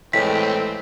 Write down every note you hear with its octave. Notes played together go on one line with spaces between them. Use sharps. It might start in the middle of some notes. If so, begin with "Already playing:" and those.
A2 E3 G#3 C4 C#5 B6